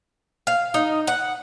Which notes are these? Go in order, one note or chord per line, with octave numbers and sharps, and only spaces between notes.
F5
D#4
F#5